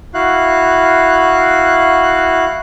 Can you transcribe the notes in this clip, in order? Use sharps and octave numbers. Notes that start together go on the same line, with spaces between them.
E4 F#4 F5 F#6